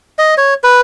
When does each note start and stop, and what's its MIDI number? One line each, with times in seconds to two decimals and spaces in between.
0.19 0.34 75
0.37 0.54 73
0.64 0.81 71